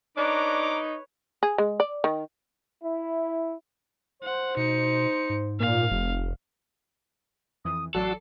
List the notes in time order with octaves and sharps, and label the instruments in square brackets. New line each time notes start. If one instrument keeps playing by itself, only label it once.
[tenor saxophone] D4 [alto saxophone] D#4 [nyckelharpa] B4 C#5 [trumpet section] A#5 D6
[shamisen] G#4
G#3
D5
D#3
[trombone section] E4
[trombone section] C5 [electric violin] F#5
[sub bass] B2 [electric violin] D#4 C#7
[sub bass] G#2
[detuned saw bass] A#2 [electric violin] F5
[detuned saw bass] F1
[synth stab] F2 E3 [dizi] D#6
[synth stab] A1 F#3 C7 [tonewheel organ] F#4 E6 [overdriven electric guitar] A4 [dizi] D5